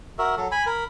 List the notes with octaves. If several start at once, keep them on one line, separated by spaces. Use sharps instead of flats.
F#4 A#4 E5
F#3 A4
G#5 B5
A#4 B5